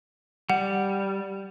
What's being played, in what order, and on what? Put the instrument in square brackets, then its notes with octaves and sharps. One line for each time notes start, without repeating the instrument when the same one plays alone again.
[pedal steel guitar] G3 [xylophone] F#5